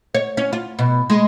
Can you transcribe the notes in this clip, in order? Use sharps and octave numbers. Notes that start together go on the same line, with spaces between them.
C#5
C#4
F4
B2
G#3